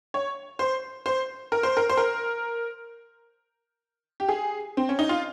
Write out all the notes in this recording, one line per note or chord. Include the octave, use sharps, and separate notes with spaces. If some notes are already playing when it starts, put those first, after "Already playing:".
C#5
C5
C5
A#4
C5
A#4
C5
A#4
G4
G#4
C4
C#4
D#4
F4